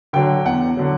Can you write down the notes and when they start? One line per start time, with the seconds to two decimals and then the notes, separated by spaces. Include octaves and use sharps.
0.13 D3 F#3 G5
0.45 E2 F#5
0.77 D3 F#3